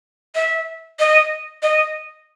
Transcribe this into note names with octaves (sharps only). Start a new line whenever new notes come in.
E5
D#5
D#5